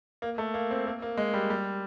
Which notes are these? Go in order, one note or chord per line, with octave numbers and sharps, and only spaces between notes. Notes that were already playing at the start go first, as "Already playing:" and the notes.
A#3
A3
A#3
C4
A#3
A#3
G#3
G3
G3